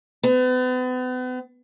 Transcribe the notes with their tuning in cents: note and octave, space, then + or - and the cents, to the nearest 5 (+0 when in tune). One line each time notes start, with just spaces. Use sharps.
B3 +40